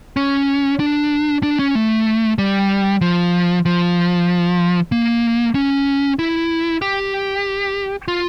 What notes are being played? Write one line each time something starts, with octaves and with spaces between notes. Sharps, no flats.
C#4
D4
D4
C#4
A3
G3
F3
F3
A#3
C#4
E4
G4
F4